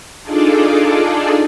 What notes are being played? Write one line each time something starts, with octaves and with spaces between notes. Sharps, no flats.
D4 D#4 F4 G#4 A4 D5